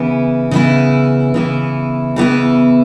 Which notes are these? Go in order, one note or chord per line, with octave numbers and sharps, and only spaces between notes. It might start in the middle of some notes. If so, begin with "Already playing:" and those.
Already playing: C#3 E3 B3 E4
C#3 E3 B3 E4
C#3 E3 B3 E4
C#3 E3 B3 E4